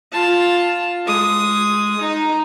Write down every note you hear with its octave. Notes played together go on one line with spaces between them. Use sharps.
F4 A5
G#3 D#6
D#4